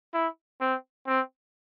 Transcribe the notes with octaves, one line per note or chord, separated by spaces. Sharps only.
E4
C4
C4